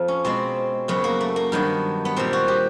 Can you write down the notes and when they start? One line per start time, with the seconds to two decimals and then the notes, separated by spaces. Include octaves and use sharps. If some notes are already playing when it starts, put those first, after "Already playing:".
Already playing: F2 F3
0.08 C#4
0.24 B2 G#3 C4
0.88 F#2 C#3 F#3 B3
1.04 A#3
1.21 A3
1.36 A#3
1.52 G2 D#3 F#3 B3
2.05 B3
2.16 A#2 G3 C4
2.33 F#4
2.48 G4